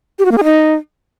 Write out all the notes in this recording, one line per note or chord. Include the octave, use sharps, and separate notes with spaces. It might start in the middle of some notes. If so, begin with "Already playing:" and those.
G4
F#4
A#3
G#4
D#4